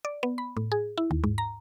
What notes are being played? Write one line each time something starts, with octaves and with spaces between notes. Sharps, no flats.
D5
B3
B5
A2
G#4
E4
D#2
G#2
A#5